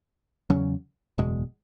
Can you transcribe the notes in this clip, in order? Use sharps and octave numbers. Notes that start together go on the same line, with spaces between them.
E2 C#3 F#3 C#4
F#1 E2 B2 G#3